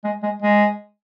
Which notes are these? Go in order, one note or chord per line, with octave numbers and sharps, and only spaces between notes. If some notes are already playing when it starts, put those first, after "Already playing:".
G#3
G#3
G#3